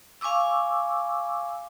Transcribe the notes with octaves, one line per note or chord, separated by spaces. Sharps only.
F5 G#5 C#6 D6 E6